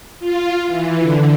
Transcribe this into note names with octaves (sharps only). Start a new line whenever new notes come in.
F4
E3
D3